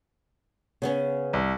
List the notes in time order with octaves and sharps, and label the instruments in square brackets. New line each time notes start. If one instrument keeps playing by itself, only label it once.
[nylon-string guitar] C#3 B3 C#4
[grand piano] C2